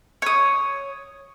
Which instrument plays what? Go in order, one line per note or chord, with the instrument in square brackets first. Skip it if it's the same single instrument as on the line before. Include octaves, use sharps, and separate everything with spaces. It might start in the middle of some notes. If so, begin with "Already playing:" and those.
[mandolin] C#5 D#6